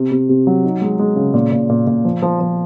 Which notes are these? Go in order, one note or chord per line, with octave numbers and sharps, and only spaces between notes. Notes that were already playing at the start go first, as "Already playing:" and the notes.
Already playing: C3
C3
C3
F#3
D#4
G#3
G#3
C#3
A#2
A#2
A#2
A#2
F3
F3
F3